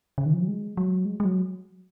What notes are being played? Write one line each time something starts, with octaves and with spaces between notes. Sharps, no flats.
C#3
D#3
F3
F#3
G#3
F#3
G#3
G#3
F#3